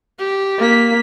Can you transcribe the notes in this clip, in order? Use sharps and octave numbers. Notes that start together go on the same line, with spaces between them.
G4
A#3 B6